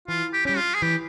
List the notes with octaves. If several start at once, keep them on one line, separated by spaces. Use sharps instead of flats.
E3 F4
G4
G3 C#4 G4
F4
G#4
E3 G4